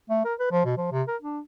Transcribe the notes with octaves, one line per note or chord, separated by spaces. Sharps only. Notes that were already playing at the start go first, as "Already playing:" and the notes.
A3
A#4
B4
F3
B2
F3
C3
A#4
D4